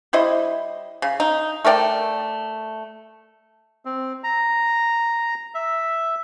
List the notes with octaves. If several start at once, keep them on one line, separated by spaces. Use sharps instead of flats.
G3 E4 C5 D#5
C#3
D#4
A3 A#4 D5 G5
C4
A#5
E5